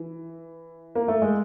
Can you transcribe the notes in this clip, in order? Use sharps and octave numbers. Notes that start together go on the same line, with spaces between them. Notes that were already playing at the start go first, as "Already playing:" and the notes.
Already playing: E3
A#3
A3
G#3